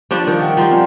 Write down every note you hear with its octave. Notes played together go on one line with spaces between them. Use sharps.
F3 G3 D4 C#6
D#3
F#5 G5
F3 G3 G5 A#5 C6
C4 D5 G#5